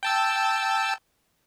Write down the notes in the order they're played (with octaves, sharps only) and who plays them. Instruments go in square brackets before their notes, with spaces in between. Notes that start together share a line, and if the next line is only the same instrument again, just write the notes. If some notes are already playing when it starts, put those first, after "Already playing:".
[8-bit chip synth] G5 A5 E6